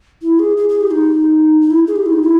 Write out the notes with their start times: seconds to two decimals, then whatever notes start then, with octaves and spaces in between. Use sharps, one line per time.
0.22 E4
0.39 G#4
0.57 G#4
0.69 G#4
0.81 G4
0.92 D#4
1.61 D#4
1.71 E4
1.88 G#4
1.96 G4
2.06 E4
2.13 D#4
2.23 E4